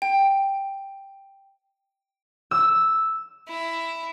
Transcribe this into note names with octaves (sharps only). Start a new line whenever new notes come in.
G5
E6
E4